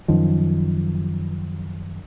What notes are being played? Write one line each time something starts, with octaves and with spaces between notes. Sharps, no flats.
F#2 D#3 F3